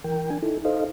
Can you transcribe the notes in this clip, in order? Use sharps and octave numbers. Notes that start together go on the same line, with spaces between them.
E3 A#4 G5
D4 G#5
D#4 E4 A4
D#4 A4 C5 D#5 F5